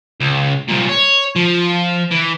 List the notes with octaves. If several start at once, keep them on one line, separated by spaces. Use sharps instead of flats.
C#2
C2 A#2
C#5
F3
E3